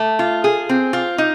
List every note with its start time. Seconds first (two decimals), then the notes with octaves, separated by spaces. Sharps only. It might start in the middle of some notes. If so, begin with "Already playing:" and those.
Already playing: A3
0.19 F4
0.44 G#4
0.69 C4
0.93 F4
1.18 D#4